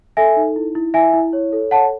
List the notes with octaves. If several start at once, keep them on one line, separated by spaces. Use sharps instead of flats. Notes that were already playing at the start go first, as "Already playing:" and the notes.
A4 E5 G#5
D#4
E4
E4
E4 E5 G#5
E4
C#5
A4
C#5 F#5 A5